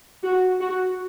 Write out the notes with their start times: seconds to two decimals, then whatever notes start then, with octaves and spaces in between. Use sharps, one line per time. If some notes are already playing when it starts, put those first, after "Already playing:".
0.23 F#4
0.60 F#4